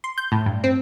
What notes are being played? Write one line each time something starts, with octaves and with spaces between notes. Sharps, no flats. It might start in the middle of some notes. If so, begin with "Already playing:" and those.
C6
G6
A2
G2
C4